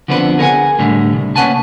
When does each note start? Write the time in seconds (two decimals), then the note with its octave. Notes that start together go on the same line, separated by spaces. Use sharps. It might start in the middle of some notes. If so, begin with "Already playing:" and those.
0.08 D3 F3 B3 C4 D4 B4
0.38 G#4 A#4 B4 F#5 G#5
0.79 A2 D3 G3
1.13 C2
1.36 A#3 C#4 B4 F#5 G#5 A5